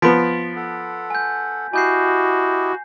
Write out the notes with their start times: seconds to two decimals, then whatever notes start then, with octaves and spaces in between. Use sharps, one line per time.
0.02 F3 B3 A6 B6 D7
0.56 A4 F#5
1.10 G#5 G6
1.74 E4 F#4 G4 D#5 G#5 G6 C7